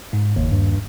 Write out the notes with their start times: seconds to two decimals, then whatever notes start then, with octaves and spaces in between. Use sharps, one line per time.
0.13 G#2
0.36 F#1 D#2
0.51 G2